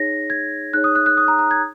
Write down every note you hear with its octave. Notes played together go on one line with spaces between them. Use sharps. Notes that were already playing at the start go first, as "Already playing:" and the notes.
Already playing: D#4 G#4 C#5 A#6
G#6
D#4 G#4 C#5 F#6
D#6
F#6
F#6
D#6
A#5
A#5
G#6